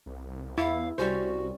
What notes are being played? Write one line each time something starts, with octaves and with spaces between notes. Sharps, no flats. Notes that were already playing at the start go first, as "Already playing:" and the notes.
C2
E2 E4 F5
C2 G3 C#4 F#4 C5